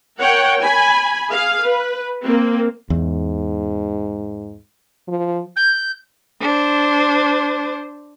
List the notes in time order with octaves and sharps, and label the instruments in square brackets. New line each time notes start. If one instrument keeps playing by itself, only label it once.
[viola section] A#4 C#5 F#5 G5
G#5 B5
G#4 F5
B4
A#3 C4
[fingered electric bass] E2 [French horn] G#2
[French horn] F3
[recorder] G6
[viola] D4 C5